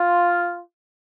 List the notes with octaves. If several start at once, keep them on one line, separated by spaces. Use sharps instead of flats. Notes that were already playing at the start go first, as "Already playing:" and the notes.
Already playing: F4